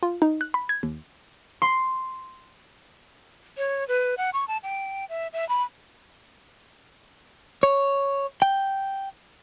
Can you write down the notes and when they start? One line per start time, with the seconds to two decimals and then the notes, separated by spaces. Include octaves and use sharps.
0.03 F4
0.22 D#4
0.41 F#6
0.54 B5
0.69 G#6
0.83 D#2
1.62 C6
3.57 C#5
3.88 B4
4.17 F#5
4.33 C#6
4.48 A5
4.63 G5
5.09 E5
5.33 E5
5.49 B5
7.63 C#5
8.42 G5